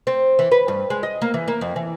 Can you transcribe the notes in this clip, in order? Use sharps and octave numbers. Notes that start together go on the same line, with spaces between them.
C4
E3
B4
G2
G#3
D#5
A#3
E3
A#3
F2
E3